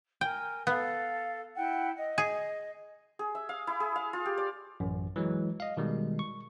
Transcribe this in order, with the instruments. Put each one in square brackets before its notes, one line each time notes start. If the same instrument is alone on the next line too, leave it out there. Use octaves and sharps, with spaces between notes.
[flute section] A#4 G#5 [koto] G5
[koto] B3 [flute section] A4 F5
[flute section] E4 F#5 G5
D#5
[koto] G#4
[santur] G#4
E5
F5
E4
G#4
F5
F4
G4
D5
[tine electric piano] A1 F#2
E3 F#3 G#3
D#5 F5
B2 D#3 G3 G#3
C#6